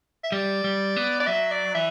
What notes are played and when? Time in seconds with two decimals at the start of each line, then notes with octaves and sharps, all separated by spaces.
0.24 E5
0.32 G3 D5
0.64 G3
0.96 B3
1.20 D5
1.27 F#3 E5
1.52 D5
1.75 E3 E5